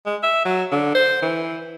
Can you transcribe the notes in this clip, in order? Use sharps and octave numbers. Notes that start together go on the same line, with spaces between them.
G#3
E5
F#3
D3
C5
E3